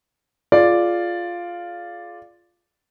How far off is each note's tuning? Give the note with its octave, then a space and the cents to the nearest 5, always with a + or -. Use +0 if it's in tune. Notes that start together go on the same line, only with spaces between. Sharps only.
F4 +0 G#4 +35 D5 +0